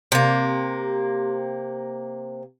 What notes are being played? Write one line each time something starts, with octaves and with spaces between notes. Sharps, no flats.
C3 A#3